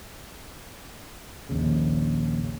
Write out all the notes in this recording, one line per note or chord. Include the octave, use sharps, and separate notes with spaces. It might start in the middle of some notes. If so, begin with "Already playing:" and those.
A#1 D#2 C#3